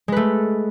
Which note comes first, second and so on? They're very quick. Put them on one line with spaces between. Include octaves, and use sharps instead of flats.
G#3 B4 A3